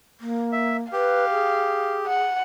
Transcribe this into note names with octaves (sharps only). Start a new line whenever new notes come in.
A#3
E5
G4 B4 F5
G#4
F#5